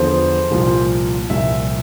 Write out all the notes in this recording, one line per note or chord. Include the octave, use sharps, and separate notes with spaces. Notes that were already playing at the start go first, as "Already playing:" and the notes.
Already playing: E2 D3 F3 C5
C2 A#2 F3
C2 A#2 F3 E5